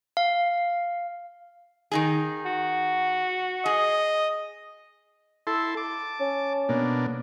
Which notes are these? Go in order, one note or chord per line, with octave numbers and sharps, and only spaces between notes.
F5
D#3 D#4 G#4
F#4
G#4 D#5
E4 A4 C6
A5 D6
C#4
B2 A#3 D4